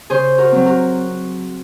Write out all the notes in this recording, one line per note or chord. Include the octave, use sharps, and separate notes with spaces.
C#3 G#4 C5
F#4 A#4
F#3 C4
F#4 A#4